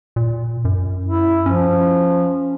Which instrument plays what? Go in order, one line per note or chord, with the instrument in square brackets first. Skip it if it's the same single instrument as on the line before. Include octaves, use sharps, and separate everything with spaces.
[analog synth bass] A#2
F#2
[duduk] E4
[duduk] F3 [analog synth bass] C#4